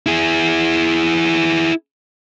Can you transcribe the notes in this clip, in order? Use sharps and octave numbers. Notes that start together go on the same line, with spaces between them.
E4 G#4